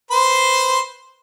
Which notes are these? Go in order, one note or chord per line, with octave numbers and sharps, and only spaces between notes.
B4 C5 C6